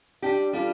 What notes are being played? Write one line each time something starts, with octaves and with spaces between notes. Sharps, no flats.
G3 D4 G4
G3 D4 F4 A4